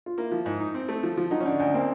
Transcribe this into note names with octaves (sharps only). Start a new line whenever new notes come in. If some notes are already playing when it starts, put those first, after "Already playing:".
F4
A#3 E4
F3
G#2
D#4
C4
A3
F3
F3
F#3 D#4
C#4
D3 D4
D2
A#3 C4